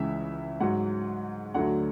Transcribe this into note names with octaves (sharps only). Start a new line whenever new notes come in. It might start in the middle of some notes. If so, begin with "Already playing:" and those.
Already playing: C#2 C#3 E3 E5
G#2 F#3 F#5
D2 D3 F#3 F#5